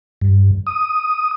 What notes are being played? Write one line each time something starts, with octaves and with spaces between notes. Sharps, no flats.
G2
D#6